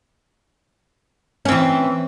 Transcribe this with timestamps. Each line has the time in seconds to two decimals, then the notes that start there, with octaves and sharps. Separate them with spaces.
1.45 C#4
1.49 C4
1.52 E3